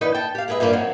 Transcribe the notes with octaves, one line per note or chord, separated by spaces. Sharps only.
D3 E3 D#4 B4
G5 A5
G4 F5
G#3 G#4 B4 D#5 E5
G2 F3 G3 A#3 F4 G4
D#3 F#3 C4